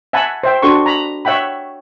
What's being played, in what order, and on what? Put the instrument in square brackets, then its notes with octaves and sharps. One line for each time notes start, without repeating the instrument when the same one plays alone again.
[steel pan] E5 F#5 G#5 A5 B5
C5 E5 G5
D4 F#4 A4 C6 C#6
A#5 B5
C#5 E5 F#5 G5 B5